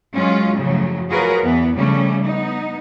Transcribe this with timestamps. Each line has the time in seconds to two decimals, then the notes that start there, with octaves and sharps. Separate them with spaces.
0.16 F#3 G#3 C#4 F4
0.59 F#2 A2 C#3 F3 F#3 A3
1.09 F4 F#4 G#4 A#4 B4 C#5
1.44 E2 E3 B3
1.76 C#3 F3 G3 A3 C#4
2.26 B3 D#4